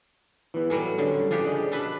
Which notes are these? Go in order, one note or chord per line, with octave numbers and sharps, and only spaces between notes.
E3 B3
A2 F#3 G3 G#5
D3 G3 C#4 D4
C#3 F3 D4 G4
G#4 D5 D#5
B2 D4 A4 B4